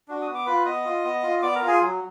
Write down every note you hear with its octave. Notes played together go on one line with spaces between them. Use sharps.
D4 F#4
D#6
B3
D6
F4 B4 B5
B3 D#5 D#6
F4
B3
F4
B3 D5 D6
A#4 A#5
F4
G#4 G#5
F#3